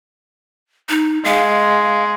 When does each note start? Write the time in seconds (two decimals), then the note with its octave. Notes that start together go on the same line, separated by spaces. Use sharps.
0.89 D#4
1.24 G#3 F5